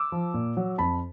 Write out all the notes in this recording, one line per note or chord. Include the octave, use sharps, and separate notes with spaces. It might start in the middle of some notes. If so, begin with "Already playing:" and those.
Already playing: D6 E6
F3
A#2
F#3
F2 A5 B5